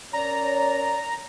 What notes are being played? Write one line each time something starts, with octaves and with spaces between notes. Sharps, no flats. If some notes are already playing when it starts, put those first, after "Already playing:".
C#4 A#4 C#5 D5 A#5